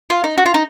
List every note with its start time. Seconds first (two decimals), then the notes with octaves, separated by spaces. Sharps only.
0.10 F4
0.24 D#4
0.38 F#4
0.46 F4
0.54 D#4